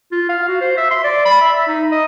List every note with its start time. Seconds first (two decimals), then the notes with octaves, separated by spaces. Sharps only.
0.12 F4
0.29 F5
0.48 F#4
0.61 C5
0.77 E5
0.91 C6
1.04 D5
1.25 B5
1.41 E5
1.53 E5
1.67 D#4
1.92 D#5